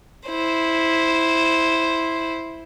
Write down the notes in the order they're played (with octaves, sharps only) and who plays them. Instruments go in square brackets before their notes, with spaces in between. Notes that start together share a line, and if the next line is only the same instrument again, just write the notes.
[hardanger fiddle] E4 C5